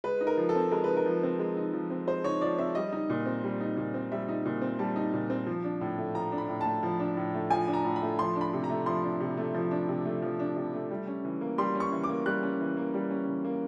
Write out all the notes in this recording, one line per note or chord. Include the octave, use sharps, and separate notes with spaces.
G#3 B4
D#4
A#4
F3
A4
C4
G#3 A#4
D#4 B4
A#4
F3
C4
G#3
D#4
F3
C4
G#3 C5
D#4 C#5
F3 D5
C4 E5
G3 D#5
D#4
A#2
C4
G3
D#4
A#2
C4
G3 E5
D#4
A#2
C4
G3 A5
D#4
A#2
C4
F3
D4
A2
A3
F3 A#5
D4
B5
A2
A5
A3
F3
D4
A2
A3
F3 G#5
D4
A#5
A2
B5
A3
F3 C6
D4
B5
C3
A#5
A3
F3 C6
D4
C3
A3
F3
D4
C3
A3
F3
D4
C3
A3
G3
C#4
E3
A#3
G3 C6
C#4
C#6
E3
D6
A#3
G3 F#6
C#4
E3
A#3
G3
C#4
E3
A#3